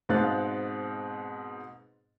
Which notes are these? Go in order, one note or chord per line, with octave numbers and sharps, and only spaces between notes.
G#2 B2 C4 F5 F#6 A6